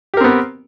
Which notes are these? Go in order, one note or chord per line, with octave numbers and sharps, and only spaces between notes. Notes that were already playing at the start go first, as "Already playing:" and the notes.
B3 C4 G4 A#4